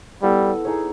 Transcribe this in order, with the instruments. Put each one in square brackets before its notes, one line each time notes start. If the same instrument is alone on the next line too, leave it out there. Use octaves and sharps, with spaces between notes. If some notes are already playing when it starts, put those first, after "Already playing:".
[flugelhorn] G3 [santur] B3 E4 A4
[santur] D#4 G#4 C#5